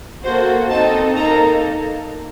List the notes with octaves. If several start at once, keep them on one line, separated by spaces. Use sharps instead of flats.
A#3 F#4 A4 C5
C4 D#4 A4 A5
A#3 D#4 A4 A#5